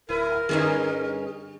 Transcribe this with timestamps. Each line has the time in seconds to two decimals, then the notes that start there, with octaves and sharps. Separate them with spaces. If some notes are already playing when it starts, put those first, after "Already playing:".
0.09 D1 E4 A#4 B4
0.49 G2 D3 G3 C#4 D#4 G#4